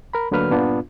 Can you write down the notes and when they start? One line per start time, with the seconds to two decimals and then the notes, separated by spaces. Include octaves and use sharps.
0.13 A#4 B5
0.31 D2 D3 F#3 A#3 B4 F6
0.50 G2 A#2 B3 D4 F4